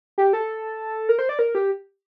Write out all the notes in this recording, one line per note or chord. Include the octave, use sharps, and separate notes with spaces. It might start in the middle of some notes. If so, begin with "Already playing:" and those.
G4
A4
A#4
C5
D5
A#4
G4